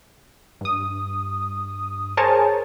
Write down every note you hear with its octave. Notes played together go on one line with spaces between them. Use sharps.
G2 D#6
G#4 A#4 C5 C#5 G#5 A5